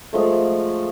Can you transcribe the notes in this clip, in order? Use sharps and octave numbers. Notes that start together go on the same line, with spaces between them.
F3 G#3 A3